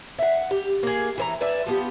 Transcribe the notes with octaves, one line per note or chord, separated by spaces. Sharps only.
E5 F#5
G4
A#3 G#4
E3 C5 A#5
B4 D5 E5 G#5
F3 B3 G4